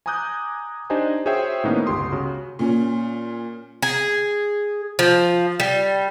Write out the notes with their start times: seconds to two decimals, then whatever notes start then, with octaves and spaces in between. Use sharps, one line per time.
0.06 G#5 A#5 D6 D#6 F#6 G6
0.90 D4 D#4 G4 C5 D#5 G#5
1.25 F#4 G#4 C5 C#5 E5 G5
1.64 A2 D#3 A#3 B3 C#4 D#4
1.86 G1 C#2 G4 C6 D#6
2.12 C#3 F#4
2.59 A#2 C#4
3.82 G#4
4.99 F3
5.60 G3